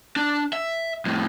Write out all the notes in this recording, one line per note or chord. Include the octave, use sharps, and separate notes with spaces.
D4
E5
F2 A2